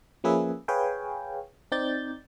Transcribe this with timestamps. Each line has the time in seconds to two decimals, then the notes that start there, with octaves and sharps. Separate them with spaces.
0.24 F3 A#3 C#4 G#4 B4 E5
0.68 G#4 B4 C#5 F5 G5 G#5
1.72 C4 D#4 D5 G6 A6